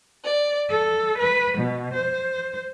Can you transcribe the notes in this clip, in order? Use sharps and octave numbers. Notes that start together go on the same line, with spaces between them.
D5
A4
B4
B2
C5